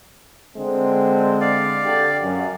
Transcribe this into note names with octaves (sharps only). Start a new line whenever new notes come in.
D3 G#3 C4
D5 F5
D3 G4
F#2